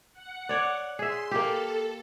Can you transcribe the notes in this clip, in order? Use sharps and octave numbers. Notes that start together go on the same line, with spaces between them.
F#5
C#5 D5
G#4 E5 C6
A#3 G4 A4